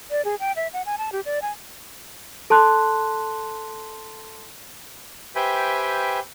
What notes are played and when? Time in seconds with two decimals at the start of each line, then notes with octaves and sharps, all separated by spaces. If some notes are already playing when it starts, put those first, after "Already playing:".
0.11 D5
0.25 G#4
0.40 G5
0.56 E5
0.73 F#5
0.86 G#5
0.98 A5
1.12 G4
1.26 D5
1.42 G#5
2.50 A4 A5 C6 F#6
5.35 G4 B4 C5 E5 G5 G#5